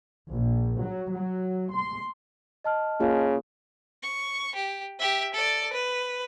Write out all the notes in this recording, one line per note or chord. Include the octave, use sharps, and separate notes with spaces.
A#1
F#3
F#3
C6
D#5 A5 F6
C#3 A#3 F4 G#4
C#6
G4
G4 E5
A4 D5
B4